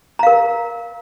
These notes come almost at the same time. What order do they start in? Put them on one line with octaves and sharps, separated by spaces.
A#5 F5 A#4